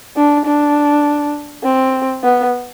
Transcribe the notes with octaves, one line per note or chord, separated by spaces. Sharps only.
D4
D4
C4
B3